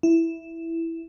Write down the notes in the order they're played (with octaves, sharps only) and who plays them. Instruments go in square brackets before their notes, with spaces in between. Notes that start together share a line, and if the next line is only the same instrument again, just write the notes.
[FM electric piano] E4